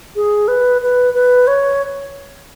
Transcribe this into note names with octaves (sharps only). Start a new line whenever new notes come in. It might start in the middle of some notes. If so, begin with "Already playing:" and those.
G#4
B4
B4
B4
C#5